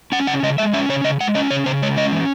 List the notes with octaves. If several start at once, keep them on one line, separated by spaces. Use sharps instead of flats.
C#4 F#5
C#3 F#5
C#3 D#5
G#3 E5
C#4 E5
C#3 C#5
C#3 D#5
G#3 F#5
C#4 D#5
C#3 C#5
C#3 C5
G#3 C#5
C#4 D#5
E3